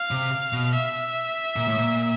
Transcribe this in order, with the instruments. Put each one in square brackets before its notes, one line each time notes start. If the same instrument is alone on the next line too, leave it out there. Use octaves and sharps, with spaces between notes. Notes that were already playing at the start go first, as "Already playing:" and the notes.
Already playing: [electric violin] F5
[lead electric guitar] C3
B2
[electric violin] E5
[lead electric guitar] A#2
A2
A#2